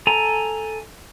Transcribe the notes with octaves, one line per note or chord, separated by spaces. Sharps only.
A4 G#5 A#5